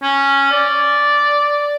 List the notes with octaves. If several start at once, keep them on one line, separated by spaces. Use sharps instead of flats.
C#4
D5